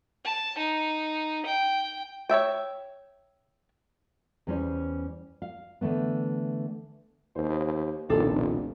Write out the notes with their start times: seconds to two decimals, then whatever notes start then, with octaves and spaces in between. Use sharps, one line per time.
0.25 A5
0.58 D#4
1.45 G5
2.29 C#5 D5 E5 G5
4.47 E2 G3 C#4 E4 C5
5.42 F5
5.81 D3 E3 A3 B3
7.36 D#2 C5
8.10 F1 B1 A#2 D#3 D4 A4